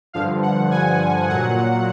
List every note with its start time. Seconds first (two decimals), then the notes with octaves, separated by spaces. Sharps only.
0.13 G2 D3 F3 F5
0.43 F#5
0.71 G#5
1.29 A#2 F#3 F#5